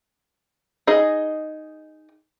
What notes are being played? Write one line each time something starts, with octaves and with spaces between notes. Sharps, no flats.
D#4 G#4 D#5